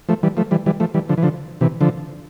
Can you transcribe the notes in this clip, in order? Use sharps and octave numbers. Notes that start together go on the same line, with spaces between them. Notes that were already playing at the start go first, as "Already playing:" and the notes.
F3 A3
E3 G3
F3 A3
E3 G3
E3 G3
F3 A3
E3 G3
D3 F3
E3
D3 F3
C3 E3
D3 F3